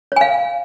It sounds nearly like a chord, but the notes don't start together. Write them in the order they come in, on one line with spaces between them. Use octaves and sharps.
C#5 G#5 F5